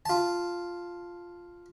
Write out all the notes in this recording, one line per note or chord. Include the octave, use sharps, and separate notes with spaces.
F4 A5